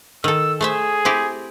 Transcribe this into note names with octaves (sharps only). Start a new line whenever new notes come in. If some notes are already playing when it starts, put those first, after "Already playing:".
D#3 A4 E6
A3 G#4 C5 E5
C4 E4 G4